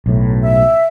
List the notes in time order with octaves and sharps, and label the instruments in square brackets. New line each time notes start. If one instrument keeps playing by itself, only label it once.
[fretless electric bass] B1 A2
[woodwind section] E5